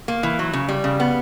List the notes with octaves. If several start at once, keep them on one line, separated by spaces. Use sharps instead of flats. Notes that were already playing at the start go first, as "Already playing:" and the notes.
A#3
E3
F#3
C#3
G3
C#3
B3